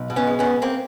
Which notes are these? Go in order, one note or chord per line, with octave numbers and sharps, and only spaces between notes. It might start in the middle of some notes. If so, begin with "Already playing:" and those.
Already playing: B1
B2
B3 C#4
G#3
B3 C#4
B1
A#3 C4